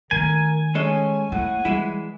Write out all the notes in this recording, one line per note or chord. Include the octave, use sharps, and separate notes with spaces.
D#3 A3 A#4 G#5
G#3 C#4 A4 D#5
A2 A3 F#5
E3 G3 G#3 E4